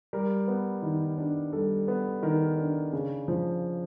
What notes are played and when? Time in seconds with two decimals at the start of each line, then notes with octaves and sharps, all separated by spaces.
0.13 G3 A#4
0.48 B3
0.82 D#3
1.18 D4
1.53 G3 A4
1.88 B3
2.23 D#3 A#4
2.58 D4
2.93 C#3
3.28 F3